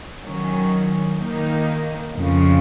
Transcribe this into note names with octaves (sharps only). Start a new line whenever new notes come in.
D#3 F#3 C#4
D#3 A#3 D#4
F2 C#3 F3